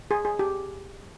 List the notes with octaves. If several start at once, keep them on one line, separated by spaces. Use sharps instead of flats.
G#4
G#4
G4